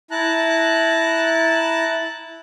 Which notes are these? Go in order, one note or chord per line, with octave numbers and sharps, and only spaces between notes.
E4 A5 A#5 F#6